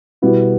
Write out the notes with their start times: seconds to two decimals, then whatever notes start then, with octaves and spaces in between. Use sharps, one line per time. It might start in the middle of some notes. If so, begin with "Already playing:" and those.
0.22 B2 G3 B3 E4